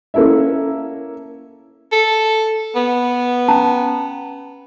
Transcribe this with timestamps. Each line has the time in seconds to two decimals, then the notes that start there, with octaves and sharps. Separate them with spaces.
0.14 A#3 C#4 E4 A4 E5
1.92 A4
2.75 B3
3.48 C#4 A5 A#5